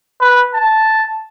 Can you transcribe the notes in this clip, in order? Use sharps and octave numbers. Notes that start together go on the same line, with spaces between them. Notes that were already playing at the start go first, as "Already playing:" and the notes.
B4
A5